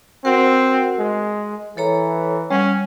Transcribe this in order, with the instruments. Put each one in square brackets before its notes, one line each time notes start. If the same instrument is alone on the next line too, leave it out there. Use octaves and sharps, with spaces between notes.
[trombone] C4 [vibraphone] F#4 A#4 F#5
[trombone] G#3
[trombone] E3 [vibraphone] A4 C#5 A#5
[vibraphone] G3 F#5 [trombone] C#4